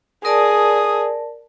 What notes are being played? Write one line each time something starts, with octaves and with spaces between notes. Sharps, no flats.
G#4 A#4 D5 A5 D#6